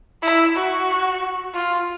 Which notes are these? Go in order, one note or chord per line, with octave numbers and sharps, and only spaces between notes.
E4
F#4
F4